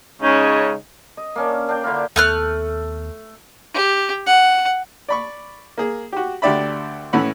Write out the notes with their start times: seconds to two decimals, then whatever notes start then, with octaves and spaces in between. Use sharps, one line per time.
0.22 C#3 G#3 C#4 D#4
1.17 D#5
1.36 A#3 C#4 D4
1.69 D4 G5
1.84 D3 E4 F4 A#4
2.16 D#2 A3 B3 F6 F#6
3.74 G4
4.27 F#5
5.09 D5 B5 C#6
5.78 A#3 G#4
6.12 F#4 G4
6.42 D2 D4 G4 D5 E5 B5
7.13 A2 E3 C#4 C#5 F#5 B5